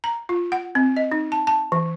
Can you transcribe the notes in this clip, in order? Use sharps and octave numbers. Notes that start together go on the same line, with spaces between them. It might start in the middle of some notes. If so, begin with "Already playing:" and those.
A#5
F4
F#5
C4
D#5
D#4
A5
A5
E3